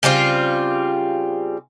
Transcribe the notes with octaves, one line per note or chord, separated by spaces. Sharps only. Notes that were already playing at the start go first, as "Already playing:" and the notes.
C#3 G3 C4 F4